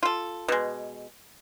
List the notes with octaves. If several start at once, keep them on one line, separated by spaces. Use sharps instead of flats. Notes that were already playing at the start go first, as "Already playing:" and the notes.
F4 A4
B2 G#3